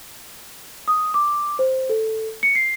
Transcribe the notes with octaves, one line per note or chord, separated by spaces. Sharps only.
D#6
D6
C5
A4
C#7
C7